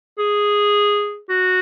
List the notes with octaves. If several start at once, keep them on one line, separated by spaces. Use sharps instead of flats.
G#4
F#4